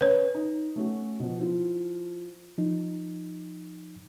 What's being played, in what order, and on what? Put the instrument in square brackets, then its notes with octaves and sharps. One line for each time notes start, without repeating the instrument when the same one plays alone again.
[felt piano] C#4 [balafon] B4 C#5
[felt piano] D#4
A3 C#4 F#4
B2 F3
F3 E4 F4
[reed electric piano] F3 D#4